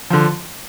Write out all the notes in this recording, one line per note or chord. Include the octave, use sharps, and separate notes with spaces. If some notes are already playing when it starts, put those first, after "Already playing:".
D3 F3